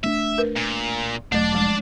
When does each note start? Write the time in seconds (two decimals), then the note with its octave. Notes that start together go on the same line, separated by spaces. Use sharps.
0.04 A3 C4 D4 E5
0.38 A#4 B4
0.57 A#2
1.32 E1 F#3 A3 D4 D5
1.53 F3 G#3